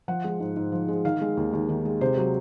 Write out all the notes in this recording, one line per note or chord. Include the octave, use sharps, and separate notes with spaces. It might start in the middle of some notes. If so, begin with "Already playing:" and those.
F3 F#5
G#3
G#2
G#2
F3
G#3
D#3 F5
G#3
D#2
D#2
D#3
G#3
C3 C5
F#3